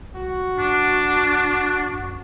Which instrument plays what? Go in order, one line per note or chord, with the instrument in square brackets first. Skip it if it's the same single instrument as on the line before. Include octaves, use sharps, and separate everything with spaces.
[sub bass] C2 [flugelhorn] F#4
[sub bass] G2 [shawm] D4
[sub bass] F#2